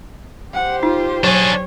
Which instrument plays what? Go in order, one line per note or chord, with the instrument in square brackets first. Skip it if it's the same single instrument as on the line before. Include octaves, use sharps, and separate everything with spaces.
[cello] G4 C5 [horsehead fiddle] F#5
[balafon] D#4 [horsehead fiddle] F4
[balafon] F#3 [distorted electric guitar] D4 G#4 [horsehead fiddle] C#5